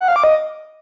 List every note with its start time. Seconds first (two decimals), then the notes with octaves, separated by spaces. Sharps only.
0.01 F#5
0.08 F5
0.16 D6
0.24 D#5